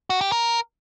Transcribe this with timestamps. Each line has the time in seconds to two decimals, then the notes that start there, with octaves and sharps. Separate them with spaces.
0.10 F#4
0.21 G4
0.32 A#4